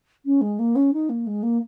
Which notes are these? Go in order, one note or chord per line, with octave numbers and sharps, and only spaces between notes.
C#4
G#3
A#3
C#4
D#4
A#3
G#3
A#3